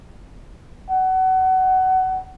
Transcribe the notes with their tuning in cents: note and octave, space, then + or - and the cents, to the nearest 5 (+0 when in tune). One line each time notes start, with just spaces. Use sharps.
F#5 +20